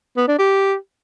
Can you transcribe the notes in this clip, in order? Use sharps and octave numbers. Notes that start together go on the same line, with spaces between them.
B3
D4
G4